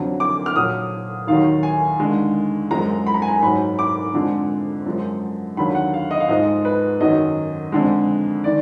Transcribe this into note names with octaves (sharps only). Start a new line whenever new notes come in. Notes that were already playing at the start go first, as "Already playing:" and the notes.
Already playing: F2 D3 F#3
D6
F6
A#2 F#3 D#6
D#2 D#3 F#3 F5
G#5
D#2 D3 G#3
F#2 F3 G#3 A#5
B5
A#5
G#5
A#5
G#2 F#3 B5
D6
F2 D3 F3 G#3
F#2 F3 G#3
D#2 D3 F#3 B5
F#5
F5
D#5
F5
G#2 F3 G#3 D#5
B4
F#2 D#3 F#3 D#5
F2 D3 G#3
D#3 D5